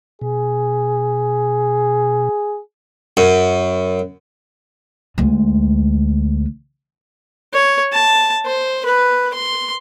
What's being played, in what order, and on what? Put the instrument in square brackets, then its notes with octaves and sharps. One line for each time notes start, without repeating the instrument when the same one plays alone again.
[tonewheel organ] B2 [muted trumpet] G#4
[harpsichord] F#2
[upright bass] D2 G#3
[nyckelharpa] C#5
A5
C5
B4
C6